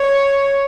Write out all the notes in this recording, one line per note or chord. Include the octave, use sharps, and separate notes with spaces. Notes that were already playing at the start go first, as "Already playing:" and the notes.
Already playing: C#5